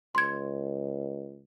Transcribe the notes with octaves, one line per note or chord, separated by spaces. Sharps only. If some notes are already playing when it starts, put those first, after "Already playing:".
C#2 C6 G#6